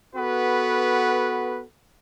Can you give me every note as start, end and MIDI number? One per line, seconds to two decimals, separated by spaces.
0.16 1.63 59
0.16 1.63 66
0.16 1.63 69
0.16 1.63 71